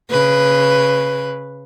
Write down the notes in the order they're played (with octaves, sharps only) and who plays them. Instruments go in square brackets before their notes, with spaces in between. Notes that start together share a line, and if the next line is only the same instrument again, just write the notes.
[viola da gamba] C#3 B4